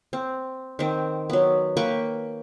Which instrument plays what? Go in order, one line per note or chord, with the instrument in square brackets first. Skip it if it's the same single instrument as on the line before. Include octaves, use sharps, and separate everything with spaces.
[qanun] C4
D#3 C4
F#3 B3
A#3 B4 G5 C#6